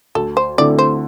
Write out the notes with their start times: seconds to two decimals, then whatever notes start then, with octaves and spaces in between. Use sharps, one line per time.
0.15 D2 A4
0.37 C5
0.58 D3 A3 C4 E4 D5
0.79 C5